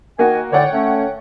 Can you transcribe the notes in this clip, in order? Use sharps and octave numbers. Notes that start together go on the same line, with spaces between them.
D#3 A#3 F#4 D#5 G#5
A2 D3 C#5 D5 F#5 G5
A3 C#4